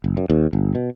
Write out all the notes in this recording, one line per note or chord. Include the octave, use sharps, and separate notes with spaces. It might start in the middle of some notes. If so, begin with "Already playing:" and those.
F#1
F#2
D#2
G1
B2